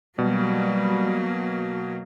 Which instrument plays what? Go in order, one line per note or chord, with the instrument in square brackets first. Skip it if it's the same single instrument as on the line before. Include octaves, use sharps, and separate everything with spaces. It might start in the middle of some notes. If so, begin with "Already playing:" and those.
[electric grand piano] B2 [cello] F#3 A#3 [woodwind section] G3